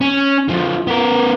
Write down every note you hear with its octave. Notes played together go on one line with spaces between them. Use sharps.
C#4
D3 F3
B3 A#4